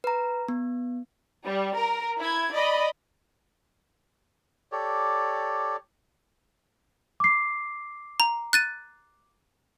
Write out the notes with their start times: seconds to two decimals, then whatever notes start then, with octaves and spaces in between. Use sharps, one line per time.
0.04 B4 A#5
0.48 B3
1.46 G3
1.77 A#4
2.20 E4 G#6
2.53 D5 D#5 B5
4.72 G4 A4 C#5 D5
7.20 D6 C7
8.20 A#5
8.53 F#6 A6 D#7